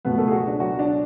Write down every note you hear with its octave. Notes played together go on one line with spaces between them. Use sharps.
C#2 B2 A3 B3 B4
A3 A4
G#4
F#3 F#4
D4
F#3 F#4
D4